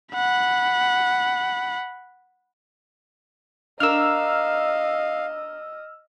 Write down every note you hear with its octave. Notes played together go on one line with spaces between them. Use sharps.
F#5 B5
D4 A#4 D#5 F5 E6 F6